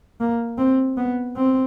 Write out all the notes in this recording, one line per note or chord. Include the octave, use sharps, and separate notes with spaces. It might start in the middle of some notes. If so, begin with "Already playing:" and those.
A#3
C4
B3
C4